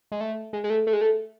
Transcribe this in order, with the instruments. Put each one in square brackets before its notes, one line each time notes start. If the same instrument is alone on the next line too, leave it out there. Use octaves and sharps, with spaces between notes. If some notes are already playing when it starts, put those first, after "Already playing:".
[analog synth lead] G#3
A3
G#3
G#3
A3
A3
G#3
A3